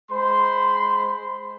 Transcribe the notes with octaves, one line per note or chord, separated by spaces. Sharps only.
G#3 C5 B5 C6